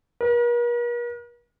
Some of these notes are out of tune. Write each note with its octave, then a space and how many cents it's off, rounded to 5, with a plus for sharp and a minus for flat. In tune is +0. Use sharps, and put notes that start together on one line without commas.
A#4 +45